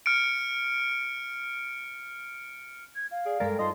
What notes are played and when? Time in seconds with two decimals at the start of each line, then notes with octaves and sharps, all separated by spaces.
0.06 F6 C#7 D7
2.95 G#6
3.11 F5
3.26 G#4 D5
3.40 G2 G3 G#3 A4 A#4 D5
3.59 D#4 F4 C5 D#5 A5 C6